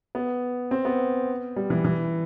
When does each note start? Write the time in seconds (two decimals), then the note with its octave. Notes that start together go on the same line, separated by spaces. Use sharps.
0.15 B3
0.71 C4
0.85 B3
1.56 G3
1.70 E3
1.84 E3